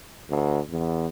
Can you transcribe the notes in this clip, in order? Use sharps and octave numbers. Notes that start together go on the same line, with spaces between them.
D2
E2